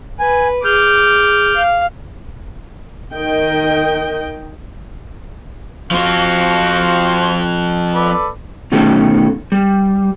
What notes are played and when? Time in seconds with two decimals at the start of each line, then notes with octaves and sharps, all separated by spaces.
0.19 B4 G#5
0.65 G#4 D6 F6 G6
1.56 F5
3.14 D#3 D#5 G5
5.91 F3 C4 F#4 C5 F5
7.94 A4 B4 D5
8.72 B2 D#3 A3 C#4 A4
9.52 G3